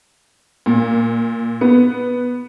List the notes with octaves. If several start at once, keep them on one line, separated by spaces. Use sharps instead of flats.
A#2
B3